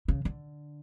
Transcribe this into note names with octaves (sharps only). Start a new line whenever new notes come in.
C#3
D3